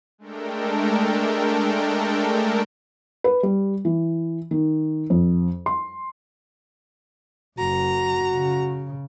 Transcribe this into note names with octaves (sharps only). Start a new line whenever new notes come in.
G#3 A3 D4 A4 A#4 G5
B4
G3
E3
D#3
F2
C6
F#1 F#4 A#5
C#3